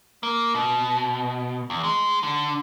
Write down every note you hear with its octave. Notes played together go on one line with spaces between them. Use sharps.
A#3
B2
E2
G#3
D3